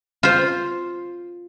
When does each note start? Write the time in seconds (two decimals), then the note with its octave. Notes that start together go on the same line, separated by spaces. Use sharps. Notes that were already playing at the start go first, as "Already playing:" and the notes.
0.23 F4 C5